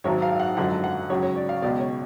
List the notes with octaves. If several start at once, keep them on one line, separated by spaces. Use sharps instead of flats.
G#1 G#2 F#3 C#5
F5
F#5
F#2 D3 F3 G#3 F#5
F#5
C#2 C#3 F#3 C#5
C#5
D5
F5
C#2 B2 G#3 D5
C#5